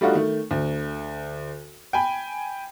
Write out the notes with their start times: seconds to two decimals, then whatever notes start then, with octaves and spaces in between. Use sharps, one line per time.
0.01 G3 A3 D4 D#4 F4 F#4
0.15 D#3 A3
0.51 D2
1.93 G5 G#5 B5